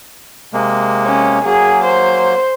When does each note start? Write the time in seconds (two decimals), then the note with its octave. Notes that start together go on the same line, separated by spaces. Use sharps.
0.53 C3 G#3 A#3
1.04 C#4
1.45 F#3 A#3 G#4
1.84 C5